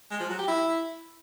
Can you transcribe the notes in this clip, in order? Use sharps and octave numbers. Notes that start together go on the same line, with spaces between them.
G#3
F3
F#3
G4
E4